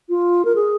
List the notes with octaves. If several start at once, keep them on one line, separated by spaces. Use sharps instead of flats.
F4
A#4
G#4